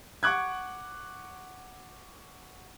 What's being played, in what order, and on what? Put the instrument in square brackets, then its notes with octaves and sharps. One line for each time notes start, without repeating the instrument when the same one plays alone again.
[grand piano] F#5 C#6 D6 F#6 G#6